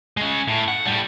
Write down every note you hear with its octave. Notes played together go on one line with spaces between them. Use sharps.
G#3 C#4
A2
F#5
A2 G3